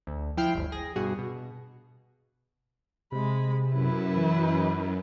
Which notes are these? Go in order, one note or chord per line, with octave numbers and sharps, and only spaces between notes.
D2
F3 E4 G5 F6 C7
G1 D2
G#4 A#6
G2 B2 F#4 G#4 F#5
B2
C3 G#3 B5
F#2 E4 B4
E3